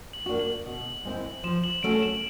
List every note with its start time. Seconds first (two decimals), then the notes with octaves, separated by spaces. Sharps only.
0.13 F#7
0.26 A#3 D4 F#4
0.39 F#7
0.65 B2
1.05 G#3 C4 E4
1.43 F3 E7
1.64 F#7
1.83 A3 C#4 F#4 A4 D7
2.02 E7